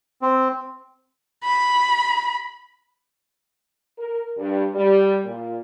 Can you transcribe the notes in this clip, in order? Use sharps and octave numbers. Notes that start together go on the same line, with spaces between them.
C4
B5
A#4
G2
G3
A#2